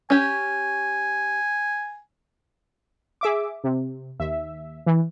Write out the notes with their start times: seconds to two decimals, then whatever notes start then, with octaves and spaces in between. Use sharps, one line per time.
0.10 C#4 G4 G#5
3.21 G#4 E5 D6
3.64 C3
4.19 D#2 E5
4.86 E3